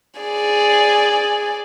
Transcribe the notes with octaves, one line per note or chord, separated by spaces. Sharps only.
G#4 D5